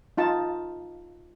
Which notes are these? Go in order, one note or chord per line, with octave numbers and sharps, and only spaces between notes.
D#4 F4 A5